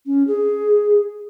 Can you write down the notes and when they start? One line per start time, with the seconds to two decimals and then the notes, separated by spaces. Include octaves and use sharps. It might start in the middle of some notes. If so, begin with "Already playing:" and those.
0.06 C#4
0.28 G#4